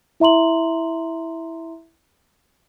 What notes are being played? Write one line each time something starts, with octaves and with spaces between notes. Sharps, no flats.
E4 E5 A#5 C6 F#7